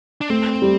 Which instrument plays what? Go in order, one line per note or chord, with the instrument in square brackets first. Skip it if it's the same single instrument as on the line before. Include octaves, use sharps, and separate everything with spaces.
[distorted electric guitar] D4
[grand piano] A3 [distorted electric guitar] C4
[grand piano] G3